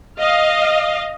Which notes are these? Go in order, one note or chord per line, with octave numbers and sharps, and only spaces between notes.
D#5 F5